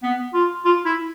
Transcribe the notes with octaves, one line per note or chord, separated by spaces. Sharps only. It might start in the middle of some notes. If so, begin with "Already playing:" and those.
B3
F4
F4
E4